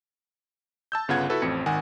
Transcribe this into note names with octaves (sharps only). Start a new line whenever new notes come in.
A5 E6 G6
G1 C#3 B3 F4 F#5 G#6
E4 F#4 A4 B4
A1 F2 C4 C#7
G#1 D#3 F#5 G#5